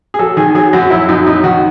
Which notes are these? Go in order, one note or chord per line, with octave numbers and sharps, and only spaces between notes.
G#4
F#3 A4
D#3 G#4
F#3 G#4
F#2 F#4
F#3 E4
F#2 D#4
F#2 D#4
D#3 F#4